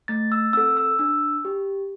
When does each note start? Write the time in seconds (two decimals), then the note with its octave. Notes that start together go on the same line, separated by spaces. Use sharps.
0.08 A3 A6
0.32 E6
0.53 C4 A4 E6
0.77 E6
0.99 D4 E6
1.45 G4